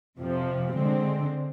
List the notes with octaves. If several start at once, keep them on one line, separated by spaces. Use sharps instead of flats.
F2 C3 F3
D3 G#3 C4